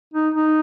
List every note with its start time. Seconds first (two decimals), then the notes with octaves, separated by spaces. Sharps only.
0.14 D#4
0.34 D#4